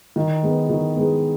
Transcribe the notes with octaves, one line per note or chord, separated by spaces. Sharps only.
D#3
G#3 B3
D#3
G#3 B3